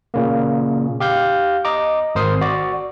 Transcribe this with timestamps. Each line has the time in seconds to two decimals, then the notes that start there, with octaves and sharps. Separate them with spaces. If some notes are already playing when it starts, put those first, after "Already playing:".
0.14 A#2 C#3 A#3
1.00 G4 F5 G6
1.65 D#5 A#5 D6
2.15 G#1 A#4 C5 D#6 C7
2.41 F#4 D5